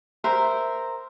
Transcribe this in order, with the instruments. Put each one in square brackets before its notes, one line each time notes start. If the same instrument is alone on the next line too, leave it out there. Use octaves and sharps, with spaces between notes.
[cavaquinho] A#4 C5 E5